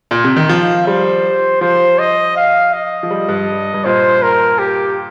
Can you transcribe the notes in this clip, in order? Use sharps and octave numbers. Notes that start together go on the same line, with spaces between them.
A#2
C3
D#3
F3 F5
G3 C5
F3 C5
D#5
F5
D#5
F3
G3
G2
G2
A#2 C5
A#4
G4